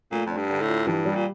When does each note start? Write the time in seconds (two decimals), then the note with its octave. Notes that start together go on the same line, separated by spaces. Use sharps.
0.12 A#2 A3
0.26 F2 D4
0.37 G2
0.49 D3
0.61 A2
0.68 F4
0.87 G2 E3
1.05 G3
1.15 A#2